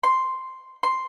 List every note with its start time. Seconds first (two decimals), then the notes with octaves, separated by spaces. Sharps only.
0.03 C6
0.83 C6